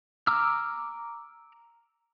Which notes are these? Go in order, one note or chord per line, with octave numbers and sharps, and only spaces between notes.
A#5 D6 E6 F6